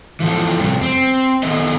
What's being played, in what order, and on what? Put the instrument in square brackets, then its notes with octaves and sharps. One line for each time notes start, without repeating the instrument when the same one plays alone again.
[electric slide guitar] E3 F3 A4
F2 C3 G3 A3
C4
F2 D#3 A3 B3 A4 D#5